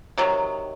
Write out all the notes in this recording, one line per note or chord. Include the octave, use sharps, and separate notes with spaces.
C3 D#3 F#3